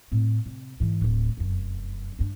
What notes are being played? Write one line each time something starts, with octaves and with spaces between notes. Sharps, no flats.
A2 C4
C3
G#2 E3
D1 A2
F1 F#2
G2 D4